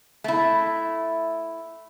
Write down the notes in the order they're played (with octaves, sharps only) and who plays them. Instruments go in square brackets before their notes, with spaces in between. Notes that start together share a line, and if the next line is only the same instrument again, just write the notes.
[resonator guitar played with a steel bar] A3 E4